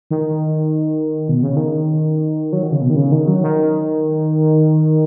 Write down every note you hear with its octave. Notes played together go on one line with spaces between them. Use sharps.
D#3
B2
C#3
D#3
F#3
D#3
C#3
B2
D#3
C#3
D#3
F#3
D#3